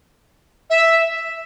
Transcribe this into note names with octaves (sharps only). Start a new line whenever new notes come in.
E5